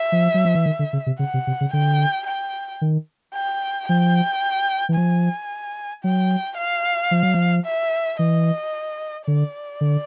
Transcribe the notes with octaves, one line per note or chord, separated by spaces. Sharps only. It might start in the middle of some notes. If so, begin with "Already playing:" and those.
Already playing: E5
F3
F#3
F3
E3
D#3
D3
C#3
C3
C#3 F#5
C3
C3
C#3
D3 G5
G5
D#3
G5
F3 G5
E3
F3 G#5
F#3 G5
F5
F3
F#3
F3
E5
E3 D#5
D3 D5
D3